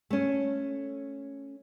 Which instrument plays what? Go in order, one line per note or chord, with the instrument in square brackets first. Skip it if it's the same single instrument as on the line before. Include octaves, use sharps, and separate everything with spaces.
[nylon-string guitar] A3 C#4